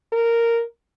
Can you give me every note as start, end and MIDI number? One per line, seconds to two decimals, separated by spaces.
0.13 0.63 70